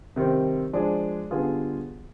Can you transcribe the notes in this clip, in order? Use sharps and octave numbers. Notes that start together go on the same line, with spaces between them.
C3 D#3 G3 C4
F3 G#3 D4 G#4
D3 G3 B3 F4 G#4